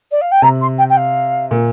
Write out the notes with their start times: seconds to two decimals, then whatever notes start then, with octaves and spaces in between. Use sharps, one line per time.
0.11 D5
0.21 F5
0.31 G5
0.42 C3 A#5
0.61 C6
0.78 G5
0.89 G5
0.97 F5
1.51 A#2